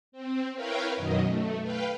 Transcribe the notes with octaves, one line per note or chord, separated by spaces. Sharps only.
C4
E4 A#4 B4 C#5 F5 G5
F#2 B2 D#3 F#3 D#5
A3
B4 F5 G5